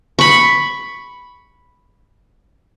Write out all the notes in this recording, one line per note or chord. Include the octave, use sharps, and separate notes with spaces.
B5 C#6